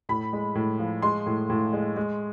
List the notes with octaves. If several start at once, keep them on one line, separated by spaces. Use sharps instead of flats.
A2 B5
G#3
A2
F3
G#3 C6
A2
A2
G#3
G#3